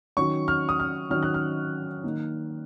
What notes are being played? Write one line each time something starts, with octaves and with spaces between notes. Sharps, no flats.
D#3 F#3 C#4 C#6
F6
D#6
F6
D#3 F#3 C#4 F6
F#6
F6
D#3 A#3 D#4